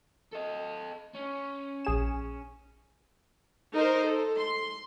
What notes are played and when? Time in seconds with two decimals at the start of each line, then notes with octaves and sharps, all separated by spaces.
0.32 A4 D#5
1.15 C#4
1.85 A#1 G#4 E7
3.73 D#4 A#4 C5
4.05 A4
4.38 C6